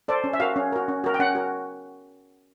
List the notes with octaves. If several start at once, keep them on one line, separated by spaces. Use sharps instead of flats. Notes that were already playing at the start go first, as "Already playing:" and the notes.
A4 C5 D5
C#4
E5
F#4 A#4 F5
C#4
F#4 A#4
C#4
F#4 A#4
G5
C#4 F#5
F#4 A#4